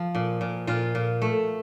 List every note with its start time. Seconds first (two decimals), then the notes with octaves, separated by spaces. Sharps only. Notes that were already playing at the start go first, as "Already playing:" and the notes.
Already playing: F3
0.15 A#2
0.41 A#2
0.67 A#2 F4
0.95 A#2
1.22 A3